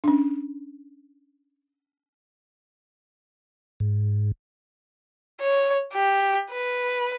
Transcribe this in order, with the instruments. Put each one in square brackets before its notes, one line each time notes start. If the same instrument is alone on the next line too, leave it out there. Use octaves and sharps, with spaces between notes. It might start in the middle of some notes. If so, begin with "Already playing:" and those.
[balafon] C#4 D4
[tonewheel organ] G#2
[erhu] C#5
G4
B4